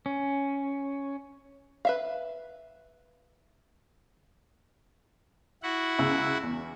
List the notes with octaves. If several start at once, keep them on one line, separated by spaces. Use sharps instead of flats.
C#4
B4 E5 F5
E4 F#4 F#5
C#2 G#4 E6
E2